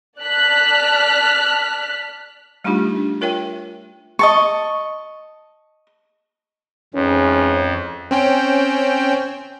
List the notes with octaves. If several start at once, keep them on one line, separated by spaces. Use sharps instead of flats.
D5 A5 F6 F#6 B6
G3 A3 D4 D#4 F4 G4
D4
F4 A#4 C#5 E5 G5
D#5 A5 C#6
F2 G#2 E3 C#4
C4 C#4 G5